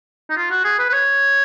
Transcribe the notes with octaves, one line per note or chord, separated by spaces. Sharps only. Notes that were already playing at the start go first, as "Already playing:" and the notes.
D#4
F4
F#4
G#4
B4
B4
C#5